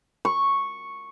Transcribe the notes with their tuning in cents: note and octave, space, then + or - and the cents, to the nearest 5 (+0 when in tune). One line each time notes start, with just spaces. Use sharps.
C#6 -5